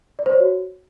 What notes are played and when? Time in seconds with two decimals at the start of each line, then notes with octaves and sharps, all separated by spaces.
0.19 D5
0.26 C5
0.33 C#5
0.40 F#4